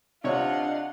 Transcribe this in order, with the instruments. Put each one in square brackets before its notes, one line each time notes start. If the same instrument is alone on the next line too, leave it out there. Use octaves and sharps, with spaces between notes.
[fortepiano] C3 C#5 [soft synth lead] D4 [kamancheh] F4 F#5 [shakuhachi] D#5